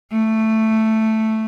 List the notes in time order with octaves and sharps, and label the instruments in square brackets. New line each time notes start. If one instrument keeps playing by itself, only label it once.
[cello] A3